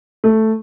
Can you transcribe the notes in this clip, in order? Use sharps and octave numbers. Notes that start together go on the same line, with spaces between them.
A3